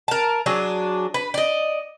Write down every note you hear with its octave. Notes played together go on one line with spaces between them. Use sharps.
A#4 A5
F#3 D4 G#4
B4
D5 D#5